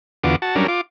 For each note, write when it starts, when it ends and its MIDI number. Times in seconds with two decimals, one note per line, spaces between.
0.24 0.36 40
0.24 0.36 50
0.24 0.36 59
0.24 0.36 65
0.24 0.36 66
0.24 0.36 86
0.42 0.55 66
0.42 0.55 81
0.56 0.67 54
0.56 0.67 55
0.56 0.67 61
0.56 0.67 62
0.56 0.67 70
0.68 0.81 65
0.68 0.81 86